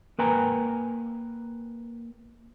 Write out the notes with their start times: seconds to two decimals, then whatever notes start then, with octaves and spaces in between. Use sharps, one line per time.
0.18 A#3 A#4 B4 G5 G#5 A#5